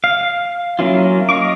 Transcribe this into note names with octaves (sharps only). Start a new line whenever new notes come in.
F5
F#3 A#3 C#4 E4 F4
D#5 F5 C#6 D6